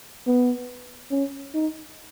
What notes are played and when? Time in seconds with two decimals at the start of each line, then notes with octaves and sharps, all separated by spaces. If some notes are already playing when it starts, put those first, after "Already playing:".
0.27 B3
1.11 C#4
1.54 D#4